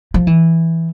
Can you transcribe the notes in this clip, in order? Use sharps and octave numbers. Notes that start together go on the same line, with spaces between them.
F3
E3